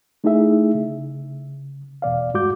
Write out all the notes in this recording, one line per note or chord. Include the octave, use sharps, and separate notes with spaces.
A3 D#4 E4 G#4 E5
C#3
E2 B2 D5 F5
G2 G#3 F#4 D6 G6